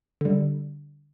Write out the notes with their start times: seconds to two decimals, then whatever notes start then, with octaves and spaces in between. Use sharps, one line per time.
0.21 D3 G3